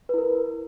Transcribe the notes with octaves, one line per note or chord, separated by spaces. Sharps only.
E4 A#4 B4